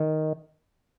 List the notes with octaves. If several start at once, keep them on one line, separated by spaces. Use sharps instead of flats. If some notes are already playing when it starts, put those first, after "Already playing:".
Already playing: D#3